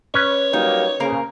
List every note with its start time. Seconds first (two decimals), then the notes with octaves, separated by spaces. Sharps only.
0.14 C#4 B4 C#5
0.53 F#3 G3 A#3 D#4
1.00 C#3 A#3 A#4 C5